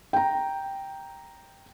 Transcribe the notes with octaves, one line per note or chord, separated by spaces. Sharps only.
G5 A#5